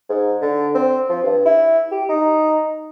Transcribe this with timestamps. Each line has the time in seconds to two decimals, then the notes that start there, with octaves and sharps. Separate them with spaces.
0.09 G#2
0.41 D3
0.74 C4
1.09 F3
1.23 G2
1.45 E4
1.91 G4
2.09 D#4